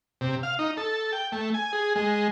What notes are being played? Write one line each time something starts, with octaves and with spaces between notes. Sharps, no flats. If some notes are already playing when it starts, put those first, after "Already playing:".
C3
F5
D#4
A4
G5
A3
G#5
G#4
G#3